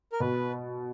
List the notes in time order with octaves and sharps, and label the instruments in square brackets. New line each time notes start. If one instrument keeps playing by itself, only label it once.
[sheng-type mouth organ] A#4
[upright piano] B2 [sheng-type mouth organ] B4